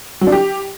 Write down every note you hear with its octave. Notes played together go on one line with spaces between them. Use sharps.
F#3
D4
G4